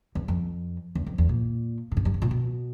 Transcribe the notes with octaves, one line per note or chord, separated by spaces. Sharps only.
E2
F2
E2
F2
E2
A#2
A2
G#2
G2
G#2
A#2
B2